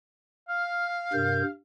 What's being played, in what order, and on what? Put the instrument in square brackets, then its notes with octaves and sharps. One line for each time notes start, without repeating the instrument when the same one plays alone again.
[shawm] F5 [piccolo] F6
[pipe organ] G2 C3 A#4 [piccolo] G6